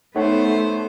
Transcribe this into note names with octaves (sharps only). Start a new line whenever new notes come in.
A3 B3 D#4 A4 C5 C#5 F#5